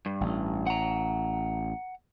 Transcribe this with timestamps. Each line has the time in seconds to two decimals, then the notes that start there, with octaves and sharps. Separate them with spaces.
0.06 G2
0.21 A1
0.67 F#5 A#5